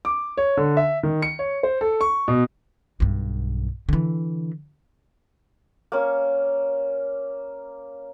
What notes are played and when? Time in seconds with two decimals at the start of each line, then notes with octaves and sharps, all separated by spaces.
0.05 D6
0.37 C#5
0.57 D3
0.77 E5
1.03 D#3
1.22 C#7
1.39 C#5
1.63 C5
1.81 A4
2.01 C#6
2.28 B2
3.00 B1 G2
3.89 D3 E3
5.92 A#3 C#4